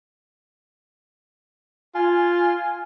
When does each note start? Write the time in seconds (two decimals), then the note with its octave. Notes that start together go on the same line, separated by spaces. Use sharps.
1.95 F4 G#5